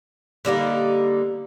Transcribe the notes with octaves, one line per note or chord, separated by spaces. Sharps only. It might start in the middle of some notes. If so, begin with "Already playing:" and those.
D3 G3 A#3 D#4